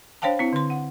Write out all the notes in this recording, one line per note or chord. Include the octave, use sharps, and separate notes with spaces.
D4 C5 C#5 F5 G5 A5
C4 E4
D3 C6
F#5